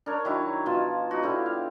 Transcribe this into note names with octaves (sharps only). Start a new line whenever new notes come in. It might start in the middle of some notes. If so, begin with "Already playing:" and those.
D4 A#4 C#5
D#3 F#3 E4
B2 F3 F4 A5
D#4 F#4
D3 E4 F4 G4
F5